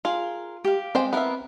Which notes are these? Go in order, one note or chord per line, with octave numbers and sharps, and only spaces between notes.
F4 G#4 A#4
G4 F5
G#3 C4 C5 G5
B3 E4 A#4 E5 F5